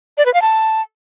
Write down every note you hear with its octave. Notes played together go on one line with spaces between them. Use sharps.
D5
B4
F5
A5